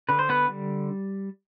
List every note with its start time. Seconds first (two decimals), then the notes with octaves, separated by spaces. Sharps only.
0.09 D3 B4
0.19 C5
0.29 B3 B4
0.49 G3